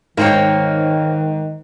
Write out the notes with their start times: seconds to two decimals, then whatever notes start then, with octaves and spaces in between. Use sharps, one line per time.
0.17 G#2 D#3 A#3 C4 C#5